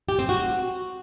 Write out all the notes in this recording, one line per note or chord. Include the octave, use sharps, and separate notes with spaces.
G4
C4
F#4